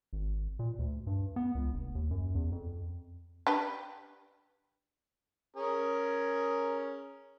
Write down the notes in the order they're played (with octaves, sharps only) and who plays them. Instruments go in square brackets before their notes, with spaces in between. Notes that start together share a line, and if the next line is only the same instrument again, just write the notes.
[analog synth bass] G#1
A#2
D2
G2
B3
C#2
F1
D#2
F#2
E2
F2
[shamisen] D4 G4 B4
[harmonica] C#4 G#4 A#4